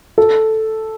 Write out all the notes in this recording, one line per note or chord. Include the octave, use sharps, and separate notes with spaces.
A4